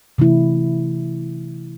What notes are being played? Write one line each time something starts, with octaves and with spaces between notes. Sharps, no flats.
C3 E3 A3 E4